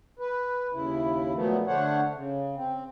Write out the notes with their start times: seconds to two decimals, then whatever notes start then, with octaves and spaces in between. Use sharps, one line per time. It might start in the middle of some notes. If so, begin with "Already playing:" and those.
0.19 B4
0.73 D#2 C#3 E4
1.35 A#2 F3 F#3 A3 B3
1.67 D3 A3 D4 C5 C#5 F#5
2.15 C#3
2.56 C4